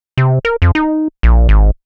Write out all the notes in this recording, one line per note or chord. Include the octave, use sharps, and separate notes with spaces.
C3
A#4
F2
D#4
A#1
G#1